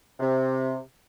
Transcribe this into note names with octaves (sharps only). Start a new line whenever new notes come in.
C3